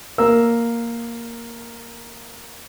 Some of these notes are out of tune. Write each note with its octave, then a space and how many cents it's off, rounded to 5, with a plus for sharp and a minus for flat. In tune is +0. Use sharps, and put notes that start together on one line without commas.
A#3 +0 E6 +0